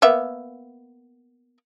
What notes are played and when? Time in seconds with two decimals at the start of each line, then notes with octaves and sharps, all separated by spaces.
0.02 A#3 B3 E5